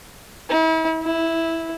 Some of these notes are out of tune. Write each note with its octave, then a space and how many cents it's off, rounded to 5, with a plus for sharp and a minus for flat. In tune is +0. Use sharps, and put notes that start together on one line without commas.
E4 -40
E4 -5